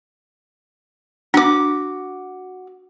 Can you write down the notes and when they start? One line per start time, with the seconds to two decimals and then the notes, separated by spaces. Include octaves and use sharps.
1.34 D4 F#4 D6